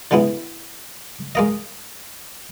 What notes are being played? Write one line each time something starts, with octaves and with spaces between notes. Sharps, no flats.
D3 G#3 B3 E4
G#3 A#3 D#5